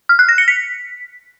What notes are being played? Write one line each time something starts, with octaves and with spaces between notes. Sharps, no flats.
F6
F#6
A#6
C#7
B6